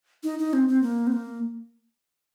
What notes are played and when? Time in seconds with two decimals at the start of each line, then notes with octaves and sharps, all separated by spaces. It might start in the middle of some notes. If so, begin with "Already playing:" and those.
0.23 D#4
0.39 D#4
0.53 C4
0.68 C4
0.83 A#3
1.07 C4
1.12 A#3